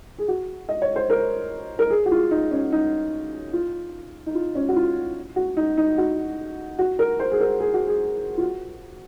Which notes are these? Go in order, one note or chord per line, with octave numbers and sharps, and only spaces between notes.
G#4
F#4
D#5
C#5
C5
A#4
A#4
G#4
F#4
F4
D#4
C#4
D#4
F4
D#4
F4
C#4
F#4
F4
F#4
D#4
D#4
F#4
F#4
A#4
C5
G#4
A#4
G#4
F#4
G#4
F4
F#4